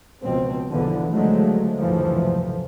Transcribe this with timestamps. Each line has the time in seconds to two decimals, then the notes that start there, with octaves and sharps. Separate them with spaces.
0.23 C#2 B2 F3 C4
0.70 B1 E2 D3 E3 F3 B3
1.11 C#2 D3 F3 F#3 G#3 A3
1.79 F#1 D2 G#2 C3 E3 F3